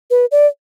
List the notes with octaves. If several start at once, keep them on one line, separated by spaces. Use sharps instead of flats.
B4
D5